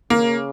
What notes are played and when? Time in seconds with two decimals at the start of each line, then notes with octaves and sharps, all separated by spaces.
0.10 C#3 A#3